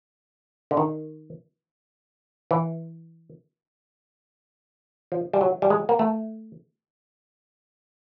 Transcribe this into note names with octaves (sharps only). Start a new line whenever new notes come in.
D3
D#3
E3
F3
G3
F#3
G3
G#3
A#3
A3